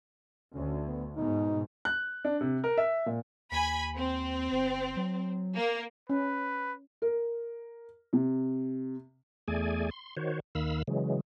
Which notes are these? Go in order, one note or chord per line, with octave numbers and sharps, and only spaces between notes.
D2 C#4
B3
G#2 B2 D#4
F#6
D4
C3
A#4
E5
A#2
D#2 G#5 B5
C4
G1
F#3
A#3
C#4 B4
A#4
C3
E2 A3 G#4 D5 G#5
C6
D#3 F#4 C5 C#5
D#2 D#3 F5 B5 E6
C#3 E3 F#3 G#3